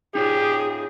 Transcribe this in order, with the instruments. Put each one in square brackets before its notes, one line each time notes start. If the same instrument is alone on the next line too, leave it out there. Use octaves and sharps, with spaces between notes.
[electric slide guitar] D#4 F4 C#5 [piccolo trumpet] G4 [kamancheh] G#4